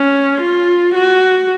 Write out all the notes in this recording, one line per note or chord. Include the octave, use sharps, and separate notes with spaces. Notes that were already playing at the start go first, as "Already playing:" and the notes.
Already playing: C#4
F4
F#4